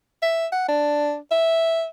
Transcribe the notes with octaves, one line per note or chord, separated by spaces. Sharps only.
E5
F#5
D4
E5